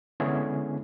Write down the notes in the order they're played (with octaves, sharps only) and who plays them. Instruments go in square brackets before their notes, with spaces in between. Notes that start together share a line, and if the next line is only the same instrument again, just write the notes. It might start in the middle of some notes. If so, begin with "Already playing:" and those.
[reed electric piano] D3 G#3 B3 C#4 E4 G#4